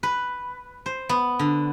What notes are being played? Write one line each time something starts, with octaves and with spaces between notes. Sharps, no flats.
B4
C5
B3
D3